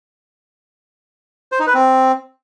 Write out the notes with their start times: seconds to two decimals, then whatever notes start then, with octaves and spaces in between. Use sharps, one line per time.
1.52 C5
1.59 D#4
1.67 B4
1.74 C4